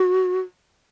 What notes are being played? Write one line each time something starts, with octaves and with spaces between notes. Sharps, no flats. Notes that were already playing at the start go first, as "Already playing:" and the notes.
Already playing: F#4